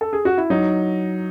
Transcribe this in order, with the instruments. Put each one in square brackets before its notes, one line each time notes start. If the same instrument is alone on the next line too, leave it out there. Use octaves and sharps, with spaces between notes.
[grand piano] A4
G#4
F#4
E4
F#3 D#4